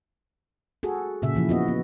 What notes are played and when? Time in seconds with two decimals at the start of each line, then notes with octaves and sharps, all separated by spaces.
0.83 F#4 G#4 A4
1.22 A#2 C#3 E5
1.35 E3 F3 E4
1.49 B3 F#4 D#5
1.68 B3